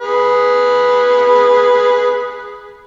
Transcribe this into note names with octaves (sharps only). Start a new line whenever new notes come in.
G#4 B4